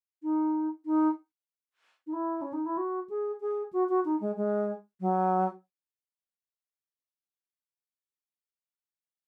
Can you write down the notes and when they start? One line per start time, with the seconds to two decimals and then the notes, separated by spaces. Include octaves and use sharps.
0.23 D#4
0.86 D#4
2.07 D#4
2.13 E4
2.42 C#4
2.53 D#4
2.66 E4
2.77 F#4
3.10 G#4
3.41 G#4
3.73 F#4
3.89 F#4
4.05 D#4
4.21 G#3
4.37 G#3
5.00 F#3